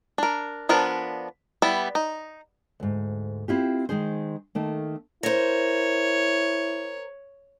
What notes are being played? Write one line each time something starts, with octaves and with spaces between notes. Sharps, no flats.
D4 A#4
F3 B3 D4 A#4
G3 B3 E4
D#4
D2 G#2
C4 E4 F4 G4
D#3 G#3 D#4 G#4 C5
D#3 A3 A#3
E4 A#4 C5 C#5